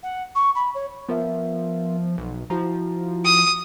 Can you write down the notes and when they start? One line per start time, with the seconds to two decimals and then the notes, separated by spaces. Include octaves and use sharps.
0.02 F#5
0.35 C#6
0.55 B5
0.74 C#5
1.09 F3 B3 A#4 E5
2.18 B1
2.50 F3 E4 F#4 A#5
3.25 D#6